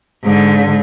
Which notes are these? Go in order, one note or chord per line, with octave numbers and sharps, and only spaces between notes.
G#2 D3